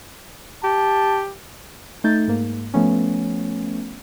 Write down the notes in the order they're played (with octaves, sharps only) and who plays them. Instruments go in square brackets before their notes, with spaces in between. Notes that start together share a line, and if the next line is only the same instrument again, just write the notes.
[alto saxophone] G4 [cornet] A5
[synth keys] A3 D#4 G6 A6
G#2 A#3
F3 A3 B3 C#4